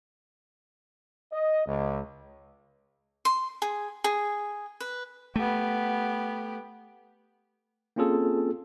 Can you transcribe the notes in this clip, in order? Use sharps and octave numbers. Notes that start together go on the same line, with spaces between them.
D#5
C#2
C6
G#4
G#4
B4
A3 B3 G4
A#3 C4 C#4 F4 G#4 A4